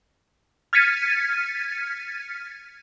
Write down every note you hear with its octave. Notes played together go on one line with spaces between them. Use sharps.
F6 G#6 A6 B6 C#7 D#7